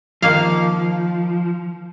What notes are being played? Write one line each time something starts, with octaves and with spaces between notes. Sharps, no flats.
D#3 F3 A#3 F5